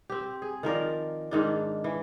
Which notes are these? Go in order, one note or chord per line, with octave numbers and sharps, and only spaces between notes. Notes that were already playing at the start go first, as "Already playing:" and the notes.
C4 G4
G#4
D#3 F3 A#4 D5
G#2 D#3 D4
E3